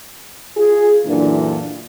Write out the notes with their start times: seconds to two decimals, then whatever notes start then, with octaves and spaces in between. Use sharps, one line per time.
0.57 F4 G#4
1.06 F#2 A#2 D3 E3 D4